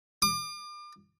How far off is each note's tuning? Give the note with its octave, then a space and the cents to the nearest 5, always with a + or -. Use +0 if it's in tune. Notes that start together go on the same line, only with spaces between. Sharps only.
D6 +35